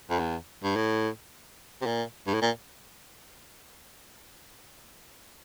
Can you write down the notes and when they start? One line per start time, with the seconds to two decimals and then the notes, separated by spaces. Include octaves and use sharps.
0.10 F2
0.19 E2
0.63 G2
0.75 A2
1.81 C3
1.86 A#2
2.27 G2
2.34 A2
2.42 A#2